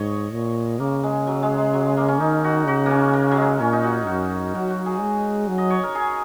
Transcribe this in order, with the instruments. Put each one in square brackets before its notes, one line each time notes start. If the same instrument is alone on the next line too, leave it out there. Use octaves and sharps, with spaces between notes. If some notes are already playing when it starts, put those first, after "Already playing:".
Already playing: [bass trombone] G#2 [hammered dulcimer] C#5 D#5
[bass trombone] A#2
[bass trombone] C#3 [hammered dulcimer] A#3
[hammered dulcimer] G#3
F#3
G#3
G#3
F#3
G#3
A#3
C#4
[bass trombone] D#3 [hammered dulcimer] D#4
[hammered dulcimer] F#4
[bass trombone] C#3 [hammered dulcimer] F#4
[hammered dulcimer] A#3
C#4
A#3
F#3
G#3
[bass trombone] A#2 [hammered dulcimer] C#4
[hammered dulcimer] D#4
F#4
[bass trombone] F#2 [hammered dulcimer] F#4
[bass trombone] F#3 [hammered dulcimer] F#4
[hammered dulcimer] F#4
G#4
[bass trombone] G#3
F#3
[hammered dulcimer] D#5
C#5
A#4
G#4